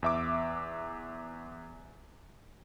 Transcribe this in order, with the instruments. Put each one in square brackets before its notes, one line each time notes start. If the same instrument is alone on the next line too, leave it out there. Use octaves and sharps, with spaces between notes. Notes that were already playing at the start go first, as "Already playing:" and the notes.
[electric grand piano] E2 E5 D6